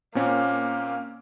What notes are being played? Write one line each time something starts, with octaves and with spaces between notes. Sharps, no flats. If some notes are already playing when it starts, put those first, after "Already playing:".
A#2 A#3 C4 C#4